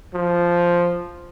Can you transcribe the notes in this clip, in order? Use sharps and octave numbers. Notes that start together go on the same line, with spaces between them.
F3